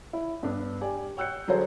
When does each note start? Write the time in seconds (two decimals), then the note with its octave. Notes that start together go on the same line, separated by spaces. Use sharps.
0.13 E4
0.43 G2 B3 D4
0.81 G4 D5 G#5
1.17 C#5 G5 E6 F#6 G6 C#7
1.48 D3 F#3 G#4 A4 C5